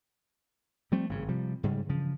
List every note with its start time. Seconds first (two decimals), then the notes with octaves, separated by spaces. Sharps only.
0.92 F3 G3 A3 C4
1.09 G#1 G2 C#3
1.28 C3 F3 G3
1.63 G#2 C#3 G3
1.89 G2 C#3 E3 F3